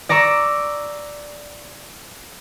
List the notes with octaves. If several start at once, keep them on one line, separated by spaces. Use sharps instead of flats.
D5 A#5 C#6 D6 E6